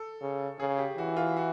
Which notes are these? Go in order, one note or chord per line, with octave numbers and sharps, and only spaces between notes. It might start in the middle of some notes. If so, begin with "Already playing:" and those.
Already playing: A4
C#3
C#3 G#4
G4
E3 F#4
F4
F#4